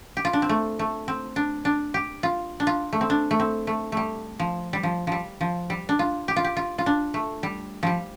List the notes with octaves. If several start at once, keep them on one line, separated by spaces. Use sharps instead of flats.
G4
F4
D4
C4
A3
A3
C4
D4
D4
G4
F4
D4
F4
A3
C4
D4
A3
C4
A3
G3 A3
F3
G3
F3
F3 G3
F3
G3
D4
F4
G4
F4
G4
F4
F4
D4
A3
G3
F3 G3